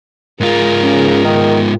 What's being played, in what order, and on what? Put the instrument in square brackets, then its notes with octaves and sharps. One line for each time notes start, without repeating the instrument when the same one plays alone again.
[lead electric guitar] G#2 F4 [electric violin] G#4 A#4
[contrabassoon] C#3
D#3